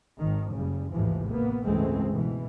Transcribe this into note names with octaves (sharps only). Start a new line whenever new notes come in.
G#1 D#3
F#1 C#3 G3
A1 D#2 G#2 C3 E3 F3
A#3 B3
C#2 G2 E3 G#3 A3 C4
B2 E3